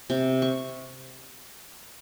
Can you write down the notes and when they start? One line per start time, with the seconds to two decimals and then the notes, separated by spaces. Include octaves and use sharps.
0.10 C3
0.42 C#6